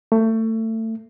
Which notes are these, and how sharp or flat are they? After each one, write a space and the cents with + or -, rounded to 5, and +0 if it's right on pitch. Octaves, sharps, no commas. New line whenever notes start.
A3 +25